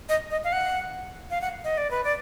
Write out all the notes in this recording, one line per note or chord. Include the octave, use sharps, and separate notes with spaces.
D#5
D#5
F5
F#5
F5
F#5
D#5
D5
B4
D5